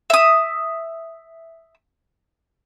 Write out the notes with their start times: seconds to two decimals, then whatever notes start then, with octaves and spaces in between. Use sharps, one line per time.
0.10 E5 D#6